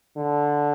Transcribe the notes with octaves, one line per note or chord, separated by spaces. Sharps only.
D3